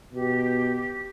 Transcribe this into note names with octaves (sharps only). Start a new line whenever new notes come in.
B2 G4